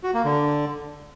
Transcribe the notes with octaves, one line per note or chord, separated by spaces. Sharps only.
F#4
A#3
D3